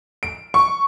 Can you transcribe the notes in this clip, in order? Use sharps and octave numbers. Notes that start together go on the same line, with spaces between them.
D7
C#6